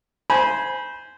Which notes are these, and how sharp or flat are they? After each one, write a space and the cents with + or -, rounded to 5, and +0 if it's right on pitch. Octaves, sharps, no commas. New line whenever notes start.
C5 -10 G#5 +0 B5 -30